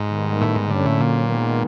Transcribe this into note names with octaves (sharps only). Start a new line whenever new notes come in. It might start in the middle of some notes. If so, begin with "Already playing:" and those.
Already playing: G#2
D#3 G3 B3
A2
G#2
G2 D3 F#3 A#3 C#4
A2
A#2
D#3 G#3 B3